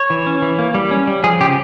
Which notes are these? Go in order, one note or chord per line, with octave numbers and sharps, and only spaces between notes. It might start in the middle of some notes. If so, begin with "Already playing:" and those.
Already playing: C#5
E3
C#4
E3
A#3
G3
C#4
G3
F3 G#4
C#3 G4